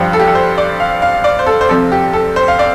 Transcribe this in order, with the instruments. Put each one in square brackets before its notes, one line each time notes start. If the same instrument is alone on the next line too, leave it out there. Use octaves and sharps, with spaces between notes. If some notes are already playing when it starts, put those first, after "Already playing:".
Already playing: [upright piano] G2 F3 G4
A4
G4
A4
C5
D5
F5
F5
D5
C5
A4
C5
C2 C3 F3 A4
G4
A4
C5
F5
D5